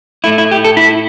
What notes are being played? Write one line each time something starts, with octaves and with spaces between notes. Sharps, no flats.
A2 A3 E4
E4
G4
A4
E4